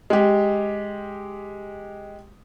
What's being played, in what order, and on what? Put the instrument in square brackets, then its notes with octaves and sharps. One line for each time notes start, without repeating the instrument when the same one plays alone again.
[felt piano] G#3 G4